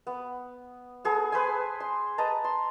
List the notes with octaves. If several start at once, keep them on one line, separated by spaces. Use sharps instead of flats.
B3
B3 G#4 A4
B4 C5 G#5
C6
B4 D#5 A5 A#5
C6